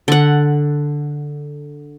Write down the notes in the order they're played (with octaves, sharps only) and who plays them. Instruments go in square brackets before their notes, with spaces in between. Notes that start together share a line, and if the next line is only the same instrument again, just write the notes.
[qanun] D3 F#5